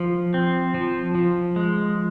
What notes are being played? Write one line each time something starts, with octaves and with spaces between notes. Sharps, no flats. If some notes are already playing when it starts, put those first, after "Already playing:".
Already playing: F3
C4
F3
F3
G#3